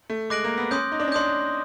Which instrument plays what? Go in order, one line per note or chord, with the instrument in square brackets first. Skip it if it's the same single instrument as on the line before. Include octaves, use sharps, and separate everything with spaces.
[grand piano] A3
[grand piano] G#3 [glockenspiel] D6 F#6 A#6 D7 F#7
[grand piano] A#3
B3
[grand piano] C#4 [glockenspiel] C6 D#6 G6
[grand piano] D#4
D4
C#4
[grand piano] D4 [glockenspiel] C6 D#6 G6